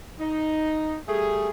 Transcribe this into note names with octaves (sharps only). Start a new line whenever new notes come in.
D#4
G3 A3 G#4